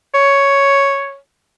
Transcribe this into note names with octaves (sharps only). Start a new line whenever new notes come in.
C#5